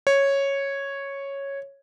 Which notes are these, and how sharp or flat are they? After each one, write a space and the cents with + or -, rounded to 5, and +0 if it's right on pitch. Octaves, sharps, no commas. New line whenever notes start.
C#5 -5